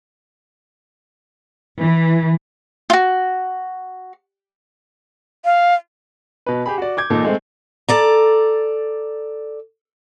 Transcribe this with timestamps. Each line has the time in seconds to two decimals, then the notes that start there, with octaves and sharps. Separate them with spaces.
1.80 E3
2.90 F4 F#4
5.45 F5
6.46 B2 B4
6.66 G4 G#4 B5
6.78 F#4 D5
6.97 D6 G6 G#6
7.10 E1 A#2 D#4 A4
7.25 G#3 A3 C4
7.89 A4 D5 A#5